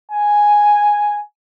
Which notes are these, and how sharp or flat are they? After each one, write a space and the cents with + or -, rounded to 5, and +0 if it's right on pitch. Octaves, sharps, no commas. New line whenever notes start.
G#5 +0